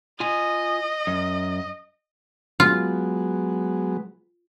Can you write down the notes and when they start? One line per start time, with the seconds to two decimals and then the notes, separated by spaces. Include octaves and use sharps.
0.20 F4 D#5 G#5
1.07 F#2
2.60 F#3 G#3 B3 F4